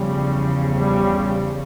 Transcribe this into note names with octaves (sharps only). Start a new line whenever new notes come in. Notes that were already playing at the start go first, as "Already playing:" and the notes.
Already playing: E2 C#3 F3 G3
G3